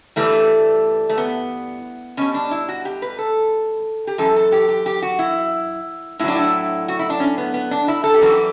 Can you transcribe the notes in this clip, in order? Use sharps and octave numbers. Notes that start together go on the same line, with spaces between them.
G2 E3 G3 A3
A3
B3
B2 G3 C#4
D4
E4
F#4
G4
B4
A4
G4
F#2 E3 A4
A4
G4
G4
G4
F#4
E4
A2 F#3 D4 E4
E4
F#4
E4
D4
C#4
B3
B3
D4
E4
A4
G4
F#2 E3 G3 F#4
G4